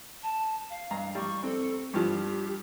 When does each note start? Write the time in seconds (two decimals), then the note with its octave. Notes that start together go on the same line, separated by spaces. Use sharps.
0.23 A5
0.70 F5
0.91 G2 A#5
1.15 G3 C#6
1.43 C4 A4
1.94 G2 F3 G4